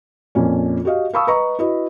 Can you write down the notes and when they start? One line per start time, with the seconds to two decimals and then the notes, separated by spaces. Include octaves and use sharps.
0.35 F2 A#2 C#4
0.85 F#4 G4 D#5 F5
1.13 F5 A5 B5 C#6 D#6 E6
1.27 B4 D#5 A#5 C#6
1.59 E4 F#4 B4 D#5